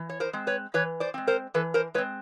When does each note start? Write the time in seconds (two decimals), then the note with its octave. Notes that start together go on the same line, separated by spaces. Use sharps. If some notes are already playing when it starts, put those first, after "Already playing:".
Already playing: E3
0.10 C#5
0.20 A#4 C5
0.33 G#3 C4
0.47 B4 C#5
0.74 E3 B4 C#5
1.00 C5 D5
1.14 G#3 C4
1.27 A#4 C5
1.54 E3 A4 B4
1.74 A#4 C5
1.94 G#3 B4 C#5
1.98 C4